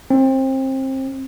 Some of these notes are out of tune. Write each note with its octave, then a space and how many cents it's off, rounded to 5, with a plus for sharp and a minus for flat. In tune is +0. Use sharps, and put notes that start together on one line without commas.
C4 +25